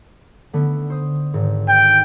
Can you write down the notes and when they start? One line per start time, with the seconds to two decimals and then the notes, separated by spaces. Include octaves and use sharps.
0.53 D3 A3 B3
0.90 C5 D#6
1.34 G#1 G#2
1.69 G5